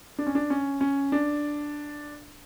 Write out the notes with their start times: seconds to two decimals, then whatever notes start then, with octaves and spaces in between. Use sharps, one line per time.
0.18 D4
0.27 C#4
0.35 D4
0.50 C#4
0.81 C#4
1.12 D4